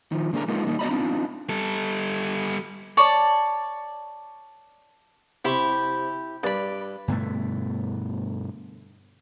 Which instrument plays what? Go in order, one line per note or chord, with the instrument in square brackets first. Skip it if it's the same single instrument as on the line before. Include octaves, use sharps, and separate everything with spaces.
[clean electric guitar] D#3 F3
D3 A#3 D4 G#4 A#4
G#3 A#3 B3 D#4 F4
G3 A#3 D#4
B3 F#4 D5 D#5 A#5 B5
B3 C4 D4 D#4 F4
[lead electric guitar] G3 A4
[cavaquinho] C#5 D5 A5
[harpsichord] C3 C5 C#6 [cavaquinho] E4 G4 B5
[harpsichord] G2 [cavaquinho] D5 B5
[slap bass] G2 B2 D3 A3